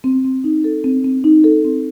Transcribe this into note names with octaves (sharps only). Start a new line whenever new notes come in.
C4
C4
D#4
A4
C4
C4
D#4
A4
C4